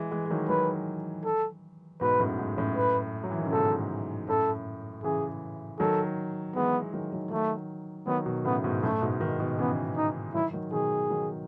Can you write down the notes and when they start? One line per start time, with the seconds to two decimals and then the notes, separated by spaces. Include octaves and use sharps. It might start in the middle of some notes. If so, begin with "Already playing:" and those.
Already playing: E3 G#3
0.11 E3 G#3
0.26 G#3
0.30 D#3 F#3
0.49 D#3 F#3 B4
1.25 A4
2.01 G#2 B2 B4
2.20 F#2 A2
2.39 G#2
2.58 F#2 A2
2.77 B4
3.24 F#3
3.31 E3
3.38 D#3
3.46 C#3
3.52 G#2 B2 A4
4.28 F#2 A2 A4
5.04 C#3 E3 G#4
5.79 D#3 F#3 A4
6.55 E3 G#3 B3
6.94 D#3 F#3
7.13 D#3 F#3
7.31 D#3 F#3 A3
8.07 D#3 F#3 B3
8.26 B2 D#3
8.45 A2 C#3 B3
8.64 G#2 B2
8.83 F#2 A2 A3
9.01 G#2 B2
9.21 B2 D#3
9.40 B2 D#3
9.58 C#3 E3 B3
9.97 D#4
10.34 D#3 F#3 E4
10.53 D#3 F#3
10.72 B2 D#3 G#4
11.10 D#3 F#3